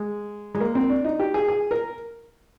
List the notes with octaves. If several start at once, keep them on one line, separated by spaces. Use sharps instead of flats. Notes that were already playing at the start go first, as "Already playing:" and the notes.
Already playing: G#3
G#3
A#3
C4
D4
D#4
G4
G#4
G#4
A#4